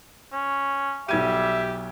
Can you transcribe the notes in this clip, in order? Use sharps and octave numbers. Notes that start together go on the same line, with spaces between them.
C#4
B1 G3 G4 E5 G#6 D#7